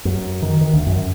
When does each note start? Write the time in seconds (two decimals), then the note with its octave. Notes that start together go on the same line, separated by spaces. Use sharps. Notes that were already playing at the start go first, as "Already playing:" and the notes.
0.05 F#2
0.42 D#3
0.61 D#3
0.73 D2
0.87 F#2